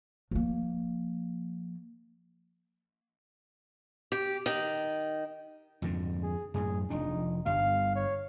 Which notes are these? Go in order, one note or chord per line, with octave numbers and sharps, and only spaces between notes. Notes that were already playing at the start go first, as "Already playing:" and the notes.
F3 A#3
G4
D#3
F2 G#2 D3
G#4
F#2 A2 G#4
F1 F3 D4 D#4
G1 G2 G3 F5
C#5